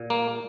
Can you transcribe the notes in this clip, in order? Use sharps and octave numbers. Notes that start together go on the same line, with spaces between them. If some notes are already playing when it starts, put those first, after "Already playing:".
Already playing: A#2
A#3